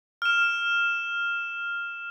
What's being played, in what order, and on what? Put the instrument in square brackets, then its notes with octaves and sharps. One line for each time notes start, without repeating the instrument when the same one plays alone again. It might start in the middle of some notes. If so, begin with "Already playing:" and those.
[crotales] F6 E7